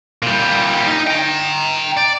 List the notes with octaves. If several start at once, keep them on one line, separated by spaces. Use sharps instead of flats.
A#2 G3
D#4
G5 A#5
D5